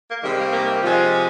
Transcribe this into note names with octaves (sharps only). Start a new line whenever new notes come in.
A#3
C3 D#3 G3 G#3
A#3
A#3
C3 F3 G#3 F4